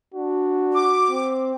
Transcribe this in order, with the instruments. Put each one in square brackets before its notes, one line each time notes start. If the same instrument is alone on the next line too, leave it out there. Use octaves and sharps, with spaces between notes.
[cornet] D4 [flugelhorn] F#4
[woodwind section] D6
[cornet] C4